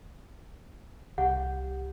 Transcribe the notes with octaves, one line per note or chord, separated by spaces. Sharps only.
C2 G4 F#5